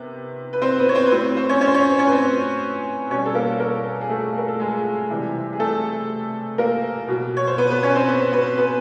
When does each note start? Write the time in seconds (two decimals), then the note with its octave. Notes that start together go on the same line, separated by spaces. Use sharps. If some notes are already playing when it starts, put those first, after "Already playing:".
Already playing: C3 D#3 B3
0.53 B4
0.62 C4 C5
0.79 B3 B4
0.89 C#5
0.95 C4 C5
1.06 B4
1.11 A2 F#3 C4 C5
1.37 C4 C5
1.49 C#4 C#5
1.61 C#4 C#5
1.67 C5
1.74 C#4 C#5
1.98 C#4 C#5
2.07 B4
2.11 C4 C5
3.10 B2 C#4 C#5
3.15 G3
3.26 A4
3.35 A#3 A#4
3.60 A#3 A#4
4.01 G#4
4.09 A3 A4
4.38 A#4
4.48 A4
4.60 G#3 G#4
5.10 C3 E3 G3
5.53 G#4
5.59 A3 A4
6.58 A#3 A#4
7.08 B2 F#3
7.37 C#5
7.47 C5
7.58 B3 B4
7.70 B3 B4
7.83 C#4 C#5
7.95 C4 C5
8.08 B3 B4
8.32 B3 B4
8.57 B3 B4